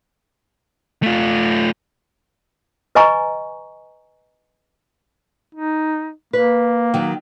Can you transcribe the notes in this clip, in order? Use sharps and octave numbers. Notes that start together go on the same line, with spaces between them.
A3 F4
B4 D#5 G#5 A#5 C#6
D#4
A#3 B4
D#3 F#3